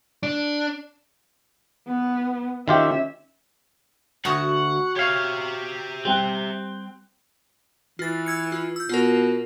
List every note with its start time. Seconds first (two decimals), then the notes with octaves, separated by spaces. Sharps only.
0.23 D4
1.88 B3
2.68 D#3 C#4 F4 G4 E5
4.25 D2 F#4 F#5 C#6 D#6
4.96 G4 C#5 E5 F5
6.05 G3 C4 G5 F#6
7.99 E3 F4 A6
8.26 E6 G#6 C#7
8.52 F4
8.76 E6 G6
8.89 B2 F4 A#4